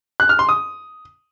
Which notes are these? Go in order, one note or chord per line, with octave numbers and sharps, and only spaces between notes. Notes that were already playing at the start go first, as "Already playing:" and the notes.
F#6
F6
C6
D#6